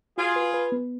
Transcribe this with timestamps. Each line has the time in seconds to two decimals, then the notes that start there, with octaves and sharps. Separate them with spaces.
0.18 F4 F#4 G#4
0.36 B4
0.54 B4
0.72 B3